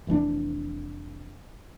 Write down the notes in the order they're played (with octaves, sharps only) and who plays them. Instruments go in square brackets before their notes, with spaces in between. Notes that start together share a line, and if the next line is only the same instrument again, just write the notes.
[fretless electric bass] F1 E3 C#4 D4